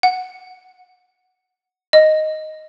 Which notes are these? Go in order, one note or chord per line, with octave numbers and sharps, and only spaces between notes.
F#5
D#5